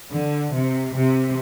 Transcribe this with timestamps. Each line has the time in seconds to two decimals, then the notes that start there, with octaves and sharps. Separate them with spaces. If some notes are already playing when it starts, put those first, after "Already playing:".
0.12 D3
0.52 C3
0.95 C3